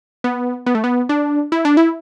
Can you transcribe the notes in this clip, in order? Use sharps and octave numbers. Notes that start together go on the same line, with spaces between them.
B3
B3
A3
B3
D4
E4
D4
E4